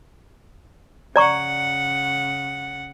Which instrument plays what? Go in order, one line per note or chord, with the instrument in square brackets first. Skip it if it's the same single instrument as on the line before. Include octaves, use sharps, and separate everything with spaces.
[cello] C#3 F#5 [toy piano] D5 A#5 C#6